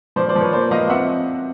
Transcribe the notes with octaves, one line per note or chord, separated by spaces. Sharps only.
F3 C5 D5
C5 D5
F3
B4 C#5
A#3 C5 D5
F3 D#5 F5
C4 E5 F#5